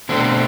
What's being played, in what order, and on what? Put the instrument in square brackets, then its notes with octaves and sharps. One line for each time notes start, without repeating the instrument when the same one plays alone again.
[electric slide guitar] B2 A3 C4 [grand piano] D3